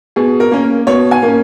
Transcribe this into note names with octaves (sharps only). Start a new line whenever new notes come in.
B2 G#4
A#4
A#3 C#4
B2 C#5
G#5
A#3
C#4